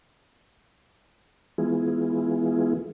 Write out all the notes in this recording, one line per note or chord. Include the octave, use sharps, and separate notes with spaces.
E3 G#3 B3 E4 F4 G#4